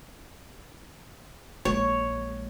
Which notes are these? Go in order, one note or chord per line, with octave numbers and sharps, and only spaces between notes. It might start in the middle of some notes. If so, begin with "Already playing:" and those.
A#1 G#3 C#5